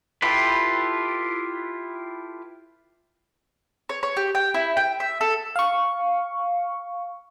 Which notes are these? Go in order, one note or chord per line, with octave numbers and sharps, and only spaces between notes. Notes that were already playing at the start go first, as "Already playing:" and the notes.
E4 F4 G4 A4 B4
C#5
C#5
G4
G5
E4
G5
E5
A4
F5 C#6